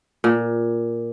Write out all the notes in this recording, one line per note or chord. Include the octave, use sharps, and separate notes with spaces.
A#2